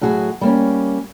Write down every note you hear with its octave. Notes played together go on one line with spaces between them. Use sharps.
A2 F#3 F#4 G#4
G3 A#3 C#4